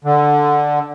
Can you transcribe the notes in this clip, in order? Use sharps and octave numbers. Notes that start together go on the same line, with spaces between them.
D3